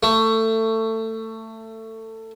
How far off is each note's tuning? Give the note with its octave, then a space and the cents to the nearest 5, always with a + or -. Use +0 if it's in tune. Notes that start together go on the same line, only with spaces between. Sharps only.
A3 +20